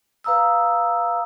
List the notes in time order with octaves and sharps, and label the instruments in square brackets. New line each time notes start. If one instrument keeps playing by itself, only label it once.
[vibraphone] B4 F5 A#5 D#6 E6